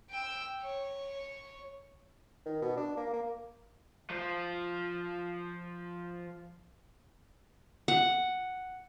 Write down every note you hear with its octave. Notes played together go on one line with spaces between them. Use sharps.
G5 E6
C#5
D#3
B2
D4
A#3
A#3
F3 C5
F#5